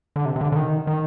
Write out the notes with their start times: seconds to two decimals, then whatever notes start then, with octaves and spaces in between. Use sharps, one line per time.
0.16 D3
0.25 C3
0.36 C3
0.41 D3
0.52 D3
0.56 D#3
0.87 D#3